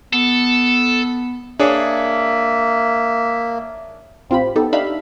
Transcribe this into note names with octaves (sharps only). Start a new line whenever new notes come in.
B3 A4
A#3 D4 G#4 C#5 E5
A1 C4 F4 G4 B5
B3 D#4 G4 A4
D4 D#4 G4 E5 F5 B5